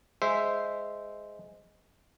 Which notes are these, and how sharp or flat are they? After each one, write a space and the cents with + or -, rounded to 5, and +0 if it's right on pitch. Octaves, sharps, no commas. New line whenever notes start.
G#3 +0 C5 -10 E5 +0